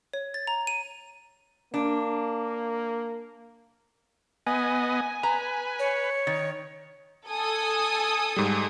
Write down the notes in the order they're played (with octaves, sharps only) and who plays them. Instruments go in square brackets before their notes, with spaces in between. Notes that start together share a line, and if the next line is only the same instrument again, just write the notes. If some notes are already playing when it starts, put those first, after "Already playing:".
[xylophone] C#5
A6
A#5
D#7
[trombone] A#3 [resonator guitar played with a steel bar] D4
[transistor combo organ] B3 D#5 [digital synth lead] G#5
[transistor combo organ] B4 [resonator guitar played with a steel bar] A#5
[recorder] C#5
[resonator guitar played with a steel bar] D#3
[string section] A4 G#5 D#6
[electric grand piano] G#2 G3